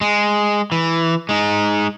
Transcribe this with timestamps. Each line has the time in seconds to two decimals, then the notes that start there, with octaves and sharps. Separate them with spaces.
0.01 G#3
0.72 E3
1.29 G#3 D#4